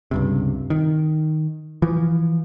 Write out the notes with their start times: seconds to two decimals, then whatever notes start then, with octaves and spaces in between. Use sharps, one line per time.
0.11 C#2 G2 C3
0.70 D#3
1.82 E3 F3